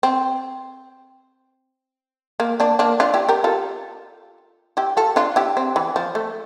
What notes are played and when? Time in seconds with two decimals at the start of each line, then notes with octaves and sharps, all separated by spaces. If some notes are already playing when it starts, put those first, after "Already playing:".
0.03 C4
2.40 A#3
2.60 A#3 D4
2.79 A#3 D4
3.00 D4 F4
3.14 E4 G4
3.29 G4 A#4
3.44 F4 A4
4.77 E4 G4
4.97 F4 A4
5.16 D4 F4
5.36 E4 G4
5.57 C4
5.76 E3
5.96 F3
6.15 A3